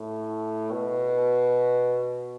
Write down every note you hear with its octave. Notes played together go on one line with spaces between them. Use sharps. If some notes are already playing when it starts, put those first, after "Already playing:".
Already playing: A2
B2